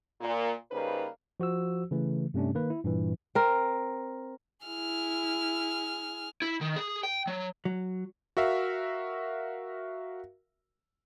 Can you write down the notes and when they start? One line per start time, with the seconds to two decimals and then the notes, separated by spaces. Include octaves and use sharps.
0.21 A#2
0.71 C#3 G3 A#3 D#4 B4 C5
1.40 F3 F#4 C5 E6
1.91 C#3 E3 A3
2.34 G2 C3 A3 C#4 D4
2.55 D#3 A#3 B4
2.70 E4
2.84 G2 A#2 E3
3.35 C4 A#4
4.66 E4 G#4 F6
6.42 E4
6.61 D#3
6.76 G#4
7.03 G5
7.27 F#3
7.65 F#3
8.37 F#4 A#4 E5 F5